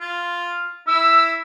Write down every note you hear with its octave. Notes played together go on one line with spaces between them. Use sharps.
F4
E4 E6